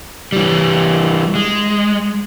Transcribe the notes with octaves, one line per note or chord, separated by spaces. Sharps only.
E3 G3
G#3